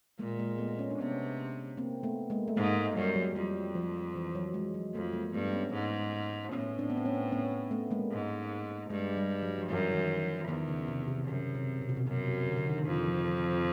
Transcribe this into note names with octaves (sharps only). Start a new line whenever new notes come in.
A#2 G#3 A#3
G#3 A#3
A3 B3
C#4
D4
C3 B3 C#4
A#3 C4
A3 B3
G#3 A#3
A3
G#2 G#3 A#3
A3
F#2 G3
F#3
F2 G3
F3
E3
F#3
G#3
F#3
F2 A3
G#3 A#3
G2 A3 B3
B3 C#4
G#2
A2 B3 C#4
C4 D4
B3
C4
B3 C#4
B3 C#4
A3 B3
G#3 A#3
G#2
G2 G#3
G3
F#3
F3
F#2 E3
D#3
E3
F3
E2 D#3
C#3
C3
C3
F#2 C#3
C3
B2
C3
B2
F#2 C3
C3
D3
D3
D#3
F2
F3
F3
F3